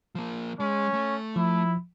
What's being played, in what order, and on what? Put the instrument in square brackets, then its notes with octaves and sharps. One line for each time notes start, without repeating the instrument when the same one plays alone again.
[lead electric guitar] F3 A#3
[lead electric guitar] G#3 [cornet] C#4
[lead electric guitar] A3
[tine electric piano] F3 [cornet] E4